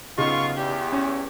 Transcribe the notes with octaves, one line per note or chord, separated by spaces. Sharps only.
B1 C#3 B3 D#4 F4 C#6
E2 G4
C#4